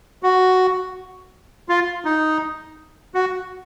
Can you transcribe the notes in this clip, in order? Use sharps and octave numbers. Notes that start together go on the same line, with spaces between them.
F#4
F4
D#4
F#4